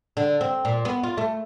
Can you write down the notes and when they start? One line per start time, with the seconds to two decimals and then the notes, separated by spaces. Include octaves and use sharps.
0.17 D3
0.41 C4
0.65 A#2
0.85 B3
1.04 F4
1.17 A3